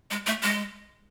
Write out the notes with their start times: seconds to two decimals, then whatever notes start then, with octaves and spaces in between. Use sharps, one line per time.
0.11 G#3
0.26 A3
0.43 G#3